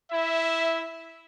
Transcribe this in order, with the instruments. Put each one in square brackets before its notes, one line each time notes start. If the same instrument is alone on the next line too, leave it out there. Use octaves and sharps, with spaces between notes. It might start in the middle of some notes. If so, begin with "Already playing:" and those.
[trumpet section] E4 E5